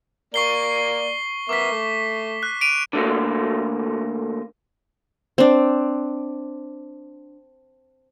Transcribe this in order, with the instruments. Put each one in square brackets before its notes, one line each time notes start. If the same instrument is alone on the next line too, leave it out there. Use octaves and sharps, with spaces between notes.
[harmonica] A#3 D5 [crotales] C#6 C7 G7
[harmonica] B3 A#4 E5 [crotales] D6 B6
[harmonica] A3
[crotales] F#6
D7 D#7 F7
[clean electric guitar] D3 A3 A#3
[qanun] C4 D4